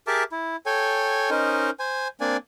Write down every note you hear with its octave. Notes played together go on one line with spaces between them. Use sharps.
G4 G#4 A#4 E5 A5 D6
E4
A4 C#5 G5 G#5
C#4 D#4 A#4 C5 D#5
C5 G#5
A#3 C4 D4 D5 G#5